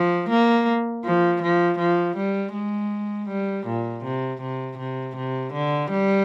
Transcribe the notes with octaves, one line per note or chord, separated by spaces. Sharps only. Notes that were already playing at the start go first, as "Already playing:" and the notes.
Already playing: F3
A#3
F3
F3
F3
G3
G#3
G3
A#2
C3
C3
C3
C3
D3
G3